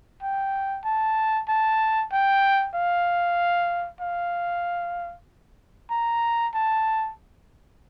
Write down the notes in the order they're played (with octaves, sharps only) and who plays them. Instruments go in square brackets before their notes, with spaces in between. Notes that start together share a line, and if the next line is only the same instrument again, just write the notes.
[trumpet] G5
A5
A5
G5
F5
F5
A#5
A5